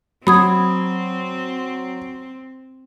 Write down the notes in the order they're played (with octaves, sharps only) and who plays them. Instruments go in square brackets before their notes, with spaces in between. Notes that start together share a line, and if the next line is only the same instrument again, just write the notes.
[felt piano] F#3 [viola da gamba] C4 [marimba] B5 D#6 G#6